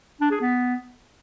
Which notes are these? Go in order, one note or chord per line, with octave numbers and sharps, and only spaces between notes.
D4
G#4
B3